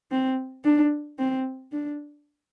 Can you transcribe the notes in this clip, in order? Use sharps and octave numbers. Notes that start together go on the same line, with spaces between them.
C4
D4
C4
D4